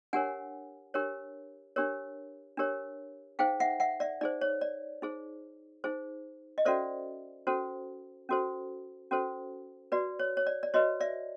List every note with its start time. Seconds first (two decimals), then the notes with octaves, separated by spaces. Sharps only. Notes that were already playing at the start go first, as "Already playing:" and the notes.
0.13 D4 G4 A#4 C#5 F#5 G#5
0.94 D4 G4 A#4 C#5
1.76 D4 G4 A#4 C#5
2.57 D4 G4 A#4 C#5
3.39 D#4 G#4 C5 F5 G5
3.60 E5 F#5
3.80 E5 F#5
4.00 D5 E5
4.21 D#4 G#4 C5 D5
4.41 C#5
4.61 D5
5.02 D#4 G#4 C5
5.84 D#4 G#4 C5
6.58 D#5
6.65 C#4 F#4 A4 C5 D5 E5
7.47 C#4 F#4 A4 C5
8.29 C#4 F#4 A4 C5
9.11 C#4 F#4 A4 C5
9.92 F#4 B4 D5
10.19 C#5
10.37 C#5
10.47 D5
10.63 D5
10.74 F#4 B4 C#5 D#5
11.00 D5 E5